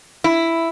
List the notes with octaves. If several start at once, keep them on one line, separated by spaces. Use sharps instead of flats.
E4